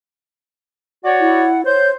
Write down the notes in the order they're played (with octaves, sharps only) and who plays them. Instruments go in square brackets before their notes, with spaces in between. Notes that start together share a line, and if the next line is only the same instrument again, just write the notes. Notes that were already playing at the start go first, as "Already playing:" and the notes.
[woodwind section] F#4 C#5 D5 [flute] F#5
[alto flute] E4
[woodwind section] C5 [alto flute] C#5 [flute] G6